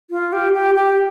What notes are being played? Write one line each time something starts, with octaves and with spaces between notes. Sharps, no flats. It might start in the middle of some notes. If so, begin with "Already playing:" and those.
F4
G4
G4
G4